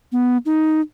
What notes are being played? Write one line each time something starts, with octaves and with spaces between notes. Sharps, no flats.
B3
D#4